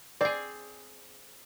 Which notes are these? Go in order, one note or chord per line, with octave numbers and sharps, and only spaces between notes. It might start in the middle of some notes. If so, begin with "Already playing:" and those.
C4 G#4 D5